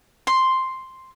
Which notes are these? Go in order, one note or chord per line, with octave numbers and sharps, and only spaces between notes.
C6